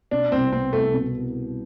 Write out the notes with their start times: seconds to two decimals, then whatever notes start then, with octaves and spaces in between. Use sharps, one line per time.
0.11 B2 D4
0.32 C2 C4
0.52 B3 C4
0.73 C2 A3
0.93 B2